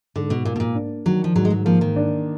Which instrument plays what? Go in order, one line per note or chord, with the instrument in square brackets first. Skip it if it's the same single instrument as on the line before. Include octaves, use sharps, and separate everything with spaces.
[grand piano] G#2 [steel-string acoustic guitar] D3
[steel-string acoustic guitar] B2
[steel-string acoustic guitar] A#2 [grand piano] A#3
[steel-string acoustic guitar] B2
A#2
[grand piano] D4
[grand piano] D#3 [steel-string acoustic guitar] F#3
[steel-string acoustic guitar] F3
[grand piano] G#2 [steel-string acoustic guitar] F#3
[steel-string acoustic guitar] G#3
F#3
[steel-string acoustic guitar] F3 [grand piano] A#3
[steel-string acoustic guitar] D#3
[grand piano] D4